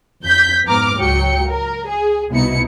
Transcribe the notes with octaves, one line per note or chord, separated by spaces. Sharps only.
F2 G6 B6
F2 G#2 B3 A#5 D6 F6
C#2 F#3 G5 C#7
A#4
G#4
C2 B2 D#4 E4 C#7